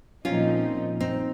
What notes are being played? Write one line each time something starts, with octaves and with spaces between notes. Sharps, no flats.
A#2 F3 C4 C#4 D#4 F4
C4 D#4